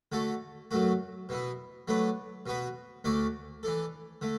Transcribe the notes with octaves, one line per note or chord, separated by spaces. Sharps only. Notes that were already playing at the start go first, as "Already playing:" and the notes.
D3 A3 F#4 A4
F#2 F#3 A3 F#4
B2 B3 E4
F#3 A3 D4 B4
B2 B3 F#4 B4
D2 D3 A3 F#4 D5
E3 D4 A4
D3 A3